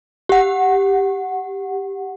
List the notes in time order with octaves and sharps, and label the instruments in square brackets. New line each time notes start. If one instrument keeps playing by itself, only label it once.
[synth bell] G4 F#5